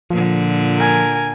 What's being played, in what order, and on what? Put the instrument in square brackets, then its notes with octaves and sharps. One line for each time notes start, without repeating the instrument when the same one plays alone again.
[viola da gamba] A#2 D3 [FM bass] F3
[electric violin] A#4 G#5